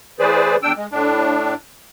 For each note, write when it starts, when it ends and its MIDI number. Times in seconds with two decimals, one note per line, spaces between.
0.19 0.56 45
0.19 0.56 52
0.19 0.56 68
0.19 0.56 71
0.19 0.56 72
0.19 0.56 74
0.63 0.72 40
0.63 0.72 62
0.63 0.72 79
0.63 0.72 88
0.77 0.86 56
0.92 1.54 45
0.92 1.54 62